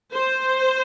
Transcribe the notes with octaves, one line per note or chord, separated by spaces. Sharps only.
C5